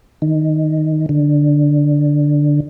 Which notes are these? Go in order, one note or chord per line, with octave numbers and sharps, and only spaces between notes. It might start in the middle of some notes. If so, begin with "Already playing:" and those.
D#3
D3